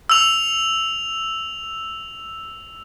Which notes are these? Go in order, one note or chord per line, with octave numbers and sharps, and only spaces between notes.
E6 F7